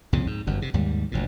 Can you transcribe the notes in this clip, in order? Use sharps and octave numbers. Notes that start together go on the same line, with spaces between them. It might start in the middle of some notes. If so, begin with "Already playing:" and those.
C2 F2 A#2 C#3
G#2
G1 F#2
C3
D#2 G#2 G3
F#1 D2 A#2